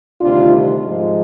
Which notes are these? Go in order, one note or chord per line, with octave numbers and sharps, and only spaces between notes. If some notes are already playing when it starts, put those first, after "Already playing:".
D2 C3 D#3 G3 D4 F4
G#2 F3 G#3